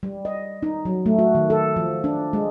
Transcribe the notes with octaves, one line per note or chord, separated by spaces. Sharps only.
G3
D#5
D#4
F#3
A3
F#4
D#3
A4
F3
D4
G#3